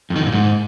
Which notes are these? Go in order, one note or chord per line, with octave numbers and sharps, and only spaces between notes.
F2
D#3
F#2
A#2
G#2